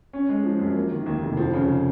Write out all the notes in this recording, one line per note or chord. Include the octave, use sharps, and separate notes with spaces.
C#4
G#3
F3
F#2
A#3
D#3
D#2
F1
F3
C#3